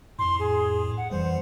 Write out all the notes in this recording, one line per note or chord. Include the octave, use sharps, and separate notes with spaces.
F2 A2 C6
G#4
F#5
F2 E3 G3 C5